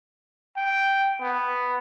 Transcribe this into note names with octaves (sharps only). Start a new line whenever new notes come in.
G5
B3